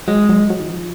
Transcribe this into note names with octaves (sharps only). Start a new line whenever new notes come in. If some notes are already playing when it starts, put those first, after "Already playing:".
F#3 G#3
F#3
F#3
D#3
F3